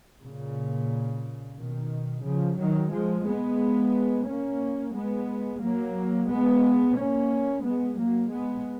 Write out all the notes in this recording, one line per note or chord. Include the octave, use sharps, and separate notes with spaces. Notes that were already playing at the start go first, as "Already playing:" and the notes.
A#2 C#3
B2 D#3
C#3 F3
D#3 F#3
F3 G#3
G#3 B3
A#3 C#4
G#3 B3
F#3 A#3
G#3 B3
A#3 C#4
G#3 B3
F#3 A#3
G#3 B3